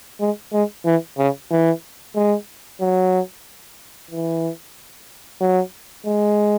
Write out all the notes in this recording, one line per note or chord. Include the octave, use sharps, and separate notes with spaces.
G#3
G#3
E3
C#3
E3
G#3
F#3
E3
F#3
G#3